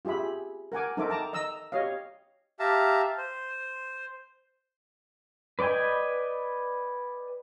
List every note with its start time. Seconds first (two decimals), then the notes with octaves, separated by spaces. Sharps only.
0.05 F4 G4 G#4 E5 B5
0.72 A#4 F#5 G#5 D6
0.97 D#4 A4 A#4 C5 E5 D6
1.09 G5 A5 A#5 D6
1.33 D#5 A#5 E6
1.72 G4 C#5 D#5 F5
2.59 G4 E5 F5 A5 A#5
3.18 C5
5.59 B4 D5 D#5 G5 G#5